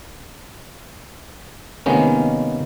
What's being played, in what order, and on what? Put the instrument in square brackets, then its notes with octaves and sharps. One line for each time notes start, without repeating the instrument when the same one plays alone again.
[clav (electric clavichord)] C3 D#3 G#3 A#3 B3 C#4